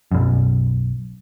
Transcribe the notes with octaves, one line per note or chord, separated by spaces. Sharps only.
B1 F#2